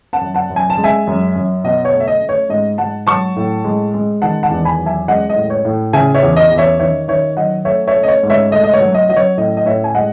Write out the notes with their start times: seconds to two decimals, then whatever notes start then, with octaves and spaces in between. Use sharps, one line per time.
0.13 F#5 A5
0.21 F#2
0.34 F#5 A5
0.50 F#2
0.56 G#5
0.70 A5
0.77 G#3
0.84 E5 G#5
1.07 F#2
1.36 F#2
1.64 B2 D#5
1.85 C#5
1.93 A3
2.00 E5
2.07 D#5
2.21 A3
2.29 C#5
2.49 G#2 D#5
2.78 G#2 F#5 A5
3.07 F#3 A5 C#6
3.36 A2
3.64 G#3
3.94 G#3
4.22 D#3 F#5 A5
4.43 F#5 A5
4.50 E2
4.65 G#5 B5
4.79 F#3
4.86 E5 G#5
5.08 G#3 D#5 F#5
5.29 D#5
5.36 A2
5.50 C#5
5.65 A2
5.93 C#3 E5 G#5
6.15 C#5 E5
6.23 E2
6.36 D#5
6.51 E2
6.58 C#5 E5
6.79 D#3 C#5 E5
7.08 D#3 C#5 E5
7.37 F#3 D#5 F#5
7.65 A3 C#5 E5
7.87 C#5 E5
7.95 A3
8.03 D#5
8.08 C#5
8.23 G#2
8.30 C#5 E5
8.52 A3 D#5
8.64 D#5
8.74 C#5
8.80 F#3
8.94 D#5
9.09 F#3 D#5
9.16 C#5
9.37 A2 D#5
9.57 D#5
9.65 A2 C#5 E5
9.84 G#5
9.95 G#3 D#5 F#5